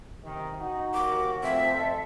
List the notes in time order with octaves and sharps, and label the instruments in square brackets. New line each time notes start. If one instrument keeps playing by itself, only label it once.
[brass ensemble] C3 D#3
[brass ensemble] D#4 [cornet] F#4
[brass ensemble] D#2 A#4 [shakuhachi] D6
[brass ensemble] F3 A3 [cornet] C4 [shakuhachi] E5
[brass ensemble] F2 [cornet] A4